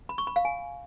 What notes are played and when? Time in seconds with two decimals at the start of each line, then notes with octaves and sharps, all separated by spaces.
0.09 B5
0.18 C#6
0.27 B5
0.36 F5
0.45 G#5